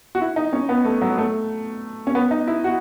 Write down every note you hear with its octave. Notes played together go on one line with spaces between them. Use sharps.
F#4
E4
D#4
C#4
B3
A3
F#3
A3
C#4
B3
D#4
E4
F#4